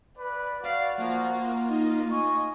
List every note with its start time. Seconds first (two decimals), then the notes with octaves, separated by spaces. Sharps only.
0.18 B4 D5
0.65 F#4 D5 F5
0.99 F3 A#3
1.37 F4
1.69 D#4 D#5
2.11 D#5 G#5 C#6